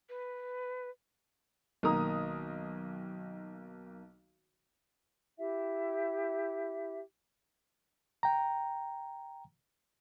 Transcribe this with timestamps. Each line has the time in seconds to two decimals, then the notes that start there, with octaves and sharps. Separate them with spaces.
0.09 B4
1.83 B1 D#3 A#3 A#5 D#6
5.38 E4 G4 E5
8.23 G5 A#5